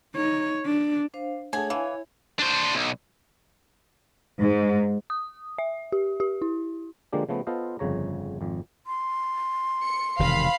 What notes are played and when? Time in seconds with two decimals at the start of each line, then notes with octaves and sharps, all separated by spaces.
0.15 D#4 C#5
0.65 D4
1.14 D4 C5 F5
1.53 A3 D4 G#4 C#5 F#5 G#5 A5
1.70 E3 E4 F5 G#5
2.39 D4 C5
2.75 B1
4.40 G#2
5.10 D#6
5.58 E5
5.92 G4
6.20 G4
6.42 E4
7.13 D3 F3 G#3 A#3 D4 G4
7.29 C#3 F3 A3 B3
7.47 B3 F4 A4 C5 D#5 F5
7.79 G1 F2 C#3 C#5 A#5
8.41 G#1 F2
8.87 C6
9.82 C#7
10.19 E1 C3 D#3 F5 B5 C7